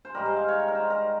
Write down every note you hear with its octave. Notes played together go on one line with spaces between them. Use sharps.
C5
G#2 D#3 G3 A#4
C5
F5
C#5
C#5
A#4
C5
A#4